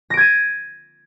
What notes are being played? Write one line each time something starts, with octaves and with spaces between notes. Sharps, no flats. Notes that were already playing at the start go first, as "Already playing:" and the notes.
G#6 A#6 D7 D#7